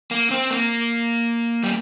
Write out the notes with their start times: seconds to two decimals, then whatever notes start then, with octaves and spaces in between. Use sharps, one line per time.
0.11 A#3
0.31 C4
0.50 A#3
1.64 G3